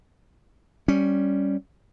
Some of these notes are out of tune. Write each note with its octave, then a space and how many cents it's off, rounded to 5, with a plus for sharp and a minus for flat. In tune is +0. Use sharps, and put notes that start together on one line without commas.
G3 +0 C#4 +0